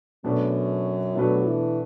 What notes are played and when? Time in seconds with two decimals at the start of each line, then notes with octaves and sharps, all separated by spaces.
0.24 F#2 B2 A3 D4 B4
1.15 B2 F#3 A3 D4 B4
1.37 F#3
1.46 E3